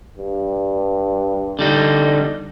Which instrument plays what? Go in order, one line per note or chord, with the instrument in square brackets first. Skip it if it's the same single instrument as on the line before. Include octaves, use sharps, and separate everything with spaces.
[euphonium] G2
[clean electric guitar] D3 G3 D#4